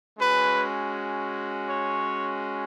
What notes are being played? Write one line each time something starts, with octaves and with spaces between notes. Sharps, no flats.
G#3 C#4 F#4 B4
C#5